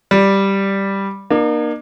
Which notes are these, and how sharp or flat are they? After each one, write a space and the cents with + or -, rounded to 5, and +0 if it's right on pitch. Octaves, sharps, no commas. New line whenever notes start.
G3 +0 D5 +0
A#3 +25 D#4 -45